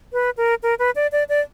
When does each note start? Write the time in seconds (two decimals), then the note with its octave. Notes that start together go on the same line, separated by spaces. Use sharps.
0.13 B4
0.37 A#4
0.63 A#4
0.79 B4
0.96 D5
1.12 D5
1.29 D5